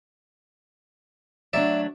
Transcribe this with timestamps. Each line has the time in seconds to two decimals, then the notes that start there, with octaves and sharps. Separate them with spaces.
1.53 F#3 A3 D4 D5 E5